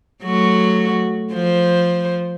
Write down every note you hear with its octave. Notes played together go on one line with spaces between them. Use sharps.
F#3 A3 F#4
F3 C5